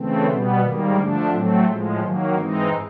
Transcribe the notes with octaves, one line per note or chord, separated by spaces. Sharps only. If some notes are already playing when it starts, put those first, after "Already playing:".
Already playing: C#3 E3 A3 C4
B2 G3 B3
G#2 D#3 G3 A#3
D3 F3 A3 D4
A2 F#3 A3 C4
A2 F3 G#3
D#3 F#3 A#3
G#2 E3 G#3 C4 D#4